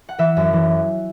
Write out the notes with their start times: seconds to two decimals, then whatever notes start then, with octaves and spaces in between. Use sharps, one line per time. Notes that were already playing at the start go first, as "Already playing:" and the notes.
0.09 F#5
0.18 E3 E5
0.37 F#2
0.53 E3